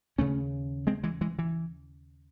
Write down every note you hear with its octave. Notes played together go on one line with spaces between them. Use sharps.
D#2 C#3 A3 C#4
G#3 C4
E3 G#3
E3 G#3
E3